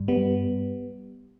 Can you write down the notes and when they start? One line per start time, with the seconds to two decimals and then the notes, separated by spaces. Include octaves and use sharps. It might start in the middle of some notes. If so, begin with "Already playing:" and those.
Already playing: G2
0.08 G3 B3